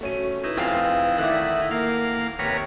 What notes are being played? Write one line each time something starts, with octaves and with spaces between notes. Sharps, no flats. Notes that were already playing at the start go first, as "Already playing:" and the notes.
A3 C#4 F#4 D#7
D#4 E4 B4
F1 C4 F4 G#4 F5
D#3 E3 A3 D5 E5 F#5
A#3 A#4 F5
D#2 C3 A#4 B4 C#5